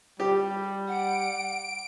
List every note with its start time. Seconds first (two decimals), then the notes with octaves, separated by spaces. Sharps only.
0.20 G3 G4
0.88 F#5 D7